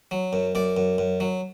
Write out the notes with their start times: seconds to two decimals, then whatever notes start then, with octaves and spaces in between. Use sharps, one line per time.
0.11 F#3
0.33 F#2
0.55 F#2 D5
0.77 F#2
0.98 F#2
1.20 F#3